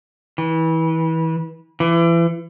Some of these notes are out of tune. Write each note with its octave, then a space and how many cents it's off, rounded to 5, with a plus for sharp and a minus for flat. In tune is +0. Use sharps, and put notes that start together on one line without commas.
E3 -25
E3 +30